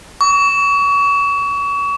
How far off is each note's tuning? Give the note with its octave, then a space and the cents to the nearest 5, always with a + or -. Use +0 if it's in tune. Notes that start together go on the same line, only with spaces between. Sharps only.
C#6 +35